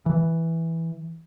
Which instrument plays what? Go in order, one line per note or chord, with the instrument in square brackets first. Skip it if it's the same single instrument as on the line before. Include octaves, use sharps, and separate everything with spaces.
[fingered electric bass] E3